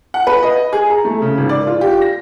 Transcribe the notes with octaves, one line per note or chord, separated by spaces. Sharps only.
F#5
B4
D#5
G#4
A#5
A3
C#3
G#1
D5
F4
G4
A#6